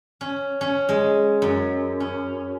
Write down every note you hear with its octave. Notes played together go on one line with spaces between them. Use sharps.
C#4
C#4
G#3
F#2
C#4